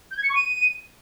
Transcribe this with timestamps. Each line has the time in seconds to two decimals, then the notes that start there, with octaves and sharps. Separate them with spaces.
0.11 G6
0.17 G#6
0.23 C#7
0.29 C#6
0.35 D#7